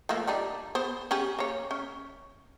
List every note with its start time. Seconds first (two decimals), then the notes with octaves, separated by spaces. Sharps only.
0.09 F3 A3 A#3
0.27 G3 D4 D#4
0.75 B3 C5
1.11 C#4 G4 G#4
1.39 A#3 C#5
1.71 C#4